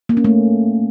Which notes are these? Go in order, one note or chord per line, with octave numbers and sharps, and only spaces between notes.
A#3
C#4
A3